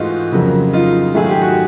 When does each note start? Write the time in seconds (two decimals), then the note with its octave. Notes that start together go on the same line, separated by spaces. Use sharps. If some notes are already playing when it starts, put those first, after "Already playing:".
Already playing: G#2 E3 A3 D#4 F4 F#4
0.32 F2 C#3 F#3 A#3
0.73 D#4 F4
1.15 G#2 D#3 F#3 A3 G#4
1.30 G4
1.42 F#4